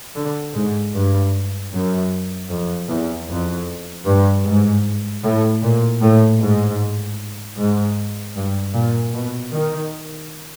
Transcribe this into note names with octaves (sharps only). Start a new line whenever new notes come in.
D3
G#2
G2
F#2
F2
E2
F2
G2
G#2
A2
A#2
A2
G#2
G#2
G2
A#2
B2
D#3